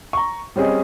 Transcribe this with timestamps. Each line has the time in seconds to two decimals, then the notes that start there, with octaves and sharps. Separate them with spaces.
0.13 A#5 C#6
0.56 G3 C4 C#4 G#4 D#5